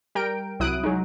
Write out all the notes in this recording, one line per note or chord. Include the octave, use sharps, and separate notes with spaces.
G3 A#4 G5 D7
C2 F#3 E4 D#6 F#6 D7
F#3 G#3 D#4